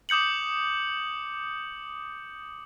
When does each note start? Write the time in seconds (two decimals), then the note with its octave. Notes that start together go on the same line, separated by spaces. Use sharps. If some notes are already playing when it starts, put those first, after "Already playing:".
0.09 D6 D#6 G6 C#7 F#7